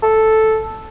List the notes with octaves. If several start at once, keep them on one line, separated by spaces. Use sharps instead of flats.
A4